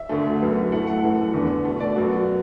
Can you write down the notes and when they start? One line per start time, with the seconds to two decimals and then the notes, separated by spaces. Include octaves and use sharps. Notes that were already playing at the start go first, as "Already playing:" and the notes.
Already playing: E5
0.09 D2 D3 A3
0.40 F#2 F#3 B3
0.71 A2 A3 F#5
0.87 F#5
1.02 F#2 E3 A3
1.34 E2 D3 B3
1.65 B2 A3
1.80 D5
1.96 F#2 F#3 B3 F#4